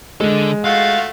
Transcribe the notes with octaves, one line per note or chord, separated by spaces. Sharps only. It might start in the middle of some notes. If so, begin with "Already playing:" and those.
D3 G#3 A4
A3 F4 F#4 F5